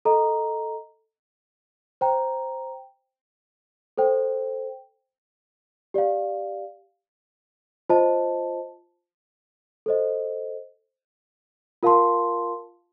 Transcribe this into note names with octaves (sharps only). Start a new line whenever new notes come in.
A4 D#5 A#5
C5 G5 A#5
A4 C5 G5
G4 D5 F5
F4 C5 D#5 A5
A4 C5 D#5
F4 A#4 F5 A5 C6